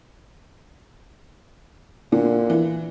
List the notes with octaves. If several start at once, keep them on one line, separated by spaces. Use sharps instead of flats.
A#2 D3
E3